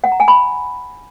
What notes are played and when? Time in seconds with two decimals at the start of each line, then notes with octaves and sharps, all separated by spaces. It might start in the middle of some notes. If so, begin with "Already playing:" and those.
0.04 F#5
0.12 A#5
0.20 G#5
0.28 B5